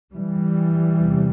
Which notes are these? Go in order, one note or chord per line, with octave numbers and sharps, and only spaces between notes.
E3 G3
E2 C3